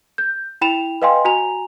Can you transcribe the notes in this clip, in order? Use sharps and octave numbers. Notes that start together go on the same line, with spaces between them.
G6
E4 G5 B5 E7 F7
B4 D#5 F5 G5 G#5 C6
F#4 G#5 A#5 F7